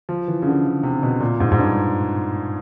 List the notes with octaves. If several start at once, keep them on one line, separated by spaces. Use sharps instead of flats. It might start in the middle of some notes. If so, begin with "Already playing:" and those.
F3
E3
C#3
D3
C#3
C3
B2
A#2
G#2
G#2
G2